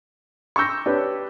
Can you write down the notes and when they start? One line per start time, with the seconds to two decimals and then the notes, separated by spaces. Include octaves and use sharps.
0.56 C#6 D6 E6 G6 A#6
0.86 D4 G4 B4 C#5